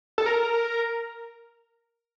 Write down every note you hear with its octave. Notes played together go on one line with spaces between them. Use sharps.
A4
A#4